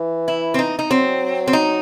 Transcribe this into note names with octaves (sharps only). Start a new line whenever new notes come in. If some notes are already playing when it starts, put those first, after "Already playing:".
Already playing: E3
E4
C4
D#4
D#4
F#3 C4
C4
D#4